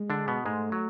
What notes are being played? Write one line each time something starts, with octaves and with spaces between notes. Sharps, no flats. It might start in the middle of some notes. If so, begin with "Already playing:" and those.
Already playing: G#3
D3 D4
B2 B3
G#2 G#3 A3
F#3